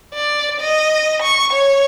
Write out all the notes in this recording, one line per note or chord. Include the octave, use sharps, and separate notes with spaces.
D5
D#5
C#6
C#5